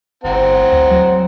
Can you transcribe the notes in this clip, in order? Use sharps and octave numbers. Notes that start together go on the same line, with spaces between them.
G1 C4 F#5 A#5
D2
F#3